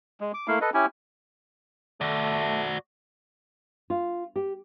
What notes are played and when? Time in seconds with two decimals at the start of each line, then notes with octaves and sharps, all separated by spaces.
0.21 G#3
0.34 D6
0.48 A3 A#3 E4 F5
0.61 A4 B4 D#5
0.74 C#4 E4 G4 G#5
2.01 A3 F#4 D5
3.90 F4
4.36 G4